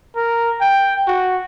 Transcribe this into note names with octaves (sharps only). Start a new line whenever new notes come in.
A#4
G5
F#4